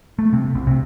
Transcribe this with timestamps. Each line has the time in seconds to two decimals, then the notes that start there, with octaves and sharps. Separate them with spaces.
0.19 A3
0.33 C3
0.55 C2
0.67 C3